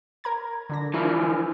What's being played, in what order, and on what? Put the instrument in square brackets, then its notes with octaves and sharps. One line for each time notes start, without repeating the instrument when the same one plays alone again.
[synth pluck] A#4 A#5 G#6
D3 D4 A#6
[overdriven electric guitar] E3 F3 [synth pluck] D4 F4 A#4